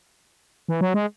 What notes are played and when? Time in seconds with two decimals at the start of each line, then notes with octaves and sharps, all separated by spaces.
0.68 E3
0.81 F#3
0.94 G#3